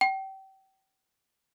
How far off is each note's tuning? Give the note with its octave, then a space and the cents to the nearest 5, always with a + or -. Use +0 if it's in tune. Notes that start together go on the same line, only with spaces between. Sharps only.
G5 -30